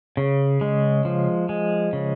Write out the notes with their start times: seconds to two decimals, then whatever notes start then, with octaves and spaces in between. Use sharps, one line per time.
0.17 C#3
0.61 G#3
1.05 F3
1.49 G#3
1.93 C#3